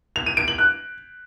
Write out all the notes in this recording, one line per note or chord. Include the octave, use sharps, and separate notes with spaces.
F7
D#7
D7
F#7
F#6